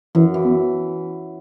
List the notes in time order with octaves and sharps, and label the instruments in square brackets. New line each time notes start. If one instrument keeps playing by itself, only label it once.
[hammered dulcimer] F#2 [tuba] E3
[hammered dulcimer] E3
[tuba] B3